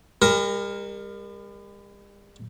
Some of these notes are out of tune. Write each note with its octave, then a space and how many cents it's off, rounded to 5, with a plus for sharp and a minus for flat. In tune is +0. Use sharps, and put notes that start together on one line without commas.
G3 +45 A#4 +0